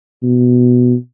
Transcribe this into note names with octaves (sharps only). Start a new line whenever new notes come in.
B2